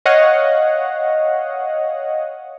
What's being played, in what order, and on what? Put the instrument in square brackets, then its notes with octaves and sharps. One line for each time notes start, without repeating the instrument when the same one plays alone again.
[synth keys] C#5 D#5 F5 F#5